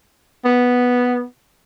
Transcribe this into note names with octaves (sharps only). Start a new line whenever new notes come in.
B3